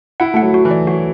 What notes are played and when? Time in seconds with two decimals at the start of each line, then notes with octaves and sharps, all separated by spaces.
0.20 E4 F#5
0.34 A3 F#5
0.42 F#3
0.54 F#4
0.65 E3
0.71 D5
0.87 F#3 F#4